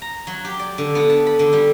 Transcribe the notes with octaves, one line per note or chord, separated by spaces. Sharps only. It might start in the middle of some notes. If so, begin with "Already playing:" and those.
A#5
F#3
G4
D5
D3
B3
A5
B5
D3
G3